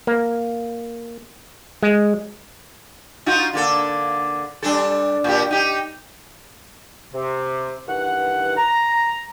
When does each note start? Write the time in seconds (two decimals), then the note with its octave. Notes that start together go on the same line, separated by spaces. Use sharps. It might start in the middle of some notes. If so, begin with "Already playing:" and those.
0.07 A#3
1.83 G#3
3.26 D#4 F4 F#4
3.53 D3 A#3 A4
4.63 G3 D4 A4
5.24 A#2 G4
5.51 D#4 G4
7.14 C3
7.88 G2 D#3 E3 F#5
8.57 A#5